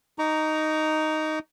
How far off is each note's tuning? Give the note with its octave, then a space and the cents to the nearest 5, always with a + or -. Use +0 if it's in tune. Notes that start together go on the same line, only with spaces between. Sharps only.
D#4 +0 A#5 +0 C#6 +45